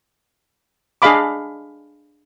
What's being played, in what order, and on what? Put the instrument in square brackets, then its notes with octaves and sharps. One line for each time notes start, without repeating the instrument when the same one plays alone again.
[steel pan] D4 G#4 D#5 F5 B5 D6